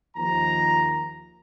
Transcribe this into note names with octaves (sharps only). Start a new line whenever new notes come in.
D#2 F3 A#5